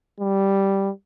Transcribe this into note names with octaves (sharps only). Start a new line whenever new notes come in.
G3